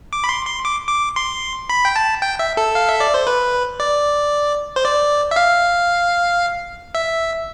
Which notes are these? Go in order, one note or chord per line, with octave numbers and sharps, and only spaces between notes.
D6
B5
C6
C6
D6
D6
C6
B5
G5
A5
G5
E5
A4
F5
E5
D5
C5
B4
D5
C5
D5
E5
F5
E5